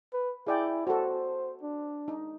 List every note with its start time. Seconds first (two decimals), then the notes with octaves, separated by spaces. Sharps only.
0.13 B4
0.47 E4 G#4 D5 G5
0.87 F#4 A4 C5
1.62 D4
2.08 D#4